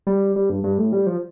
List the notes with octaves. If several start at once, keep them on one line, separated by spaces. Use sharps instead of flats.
G3
G3
G2
G2
A2
G3
F3